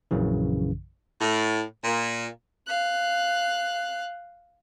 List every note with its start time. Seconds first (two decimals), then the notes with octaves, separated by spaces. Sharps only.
0.11 A#1 F#2 C#3 E3
1.21 A2
1.84 A#2
2.67 F5 F#6